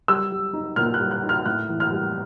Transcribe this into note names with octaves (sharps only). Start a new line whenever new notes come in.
G3 E6
G3
D#4
A#2 F6
F#6
G3
F#6
D#4
F6
A2 F#6
E3
F6
G3